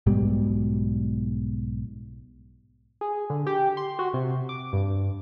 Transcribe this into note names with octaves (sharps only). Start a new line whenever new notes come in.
B1 G#2 B2 G3
G#4
D3
G4
C6
F#4
C3
D6
G2